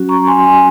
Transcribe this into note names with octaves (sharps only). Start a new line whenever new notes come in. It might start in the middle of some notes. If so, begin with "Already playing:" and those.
Already playing: F#3 C#4 F#4
A#5 C#6
G#5 C6
G#5 C6